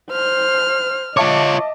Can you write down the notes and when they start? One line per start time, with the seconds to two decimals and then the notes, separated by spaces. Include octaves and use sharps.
0.12 C5 F6
1.17 F4 C#5 D#5 E5 A5 D6